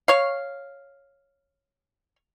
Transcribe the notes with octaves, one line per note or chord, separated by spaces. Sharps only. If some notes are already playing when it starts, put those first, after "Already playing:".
C#5 F5